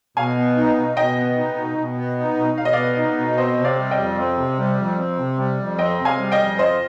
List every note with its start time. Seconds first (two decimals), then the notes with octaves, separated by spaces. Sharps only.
0.17 B2 F5 G#5
0.37 B3
0.56 D#4
0.77 B2
0.96 B2 D#5 G5
1.17 B3
1.37 D#4
1.57 B2
1.78 B2
1.97 B3
2.18 D#4
2.37 B2
2.58 B2 F5
2.65 D#5
2.73 B3 D5 F5
2.97 D#4
3.18 B2
3.38 C4 C5 D#5
3.58 C3
3.64 D5 F5
3.78 G3
3.91 D#5 G5
3.99 F2
4.18 C4
4.38 C3
4.59 G3
4.78 F2
4.98 C4
5.18 C3
5.38 G3
5.59 F2
5.78 C4 D#5 G5
5.99 C3
6.05 F5 G#5
6.19 G3
6.32 D#5 G5
6.39 F2
6.58 F4 C5 D#5